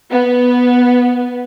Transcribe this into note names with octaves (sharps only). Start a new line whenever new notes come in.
B3